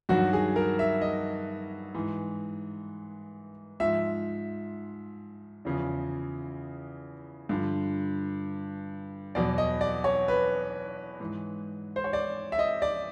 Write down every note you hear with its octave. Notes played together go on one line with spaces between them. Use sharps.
G2 D#3 F#3 F#4
G#4
A#4
E5
D#5
G#2 E3
G#2 F3 E5
E2 C#3 F3
G2 D3 F3
E2 B2 F#3 D5
D#5
D5
C#5
B4
G#2 E3
C5
C#5
D5
E5
D#5
D5